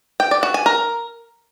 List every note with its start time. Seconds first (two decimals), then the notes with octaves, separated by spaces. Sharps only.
0.20 G5
0.31 D5
0.43 F#4
0.54 G#5
0.66 A#4